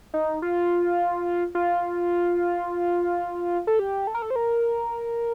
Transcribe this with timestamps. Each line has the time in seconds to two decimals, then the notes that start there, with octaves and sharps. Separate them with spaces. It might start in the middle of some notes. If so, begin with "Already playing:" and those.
0.14 D#4
0.42 F4
1.55 F4
3.67 A4
3.79 G4
4.07 A4
4.15 A#4
4.22 A4
4.30 C5
4.36 A#4